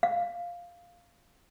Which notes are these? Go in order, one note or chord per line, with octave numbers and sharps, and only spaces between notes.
F5